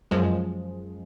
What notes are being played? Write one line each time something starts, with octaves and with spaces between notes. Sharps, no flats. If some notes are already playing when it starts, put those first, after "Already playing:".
F#2 F3 G#3